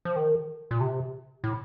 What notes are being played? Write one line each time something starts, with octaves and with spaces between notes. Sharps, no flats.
F3
D#3
A#2
C3
A2